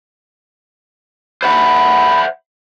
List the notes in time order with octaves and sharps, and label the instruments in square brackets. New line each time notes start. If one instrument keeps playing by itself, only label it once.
[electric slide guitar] C5 E5 F#5 [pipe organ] B5